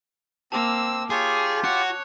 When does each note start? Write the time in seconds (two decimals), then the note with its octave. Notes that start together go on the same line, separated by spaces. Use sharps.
0.52 A#3 C4 A5 D6 E6
1.10 F4 G4 G#4 C#5
1.64 F#4 C#5 F#6 C#7